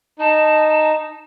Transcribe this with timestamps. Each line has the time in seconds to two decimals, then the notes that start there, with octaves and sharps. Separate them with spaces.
0.19 D#4 A5